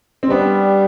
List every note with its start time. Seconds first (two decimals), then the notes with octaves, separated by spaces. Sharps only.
0.23 C4
0.30 G3 B3 D4